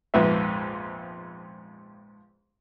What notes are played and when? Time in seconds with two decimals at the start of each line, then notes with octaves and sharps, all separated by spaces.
0.14 A#1 F2 G#2 B3 B4 E5